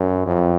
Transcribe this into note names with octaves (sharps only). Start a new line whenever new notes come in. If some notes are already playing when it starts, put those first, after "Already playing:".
Already playing: F#2
F2